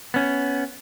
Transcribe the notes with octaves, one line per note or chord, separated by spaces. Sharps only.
B3 C#4